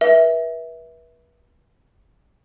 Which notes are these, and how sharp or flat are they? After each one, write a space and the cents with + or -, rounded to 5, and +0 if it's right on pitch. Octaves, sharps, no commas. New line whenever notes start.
B4 -35 E5 -10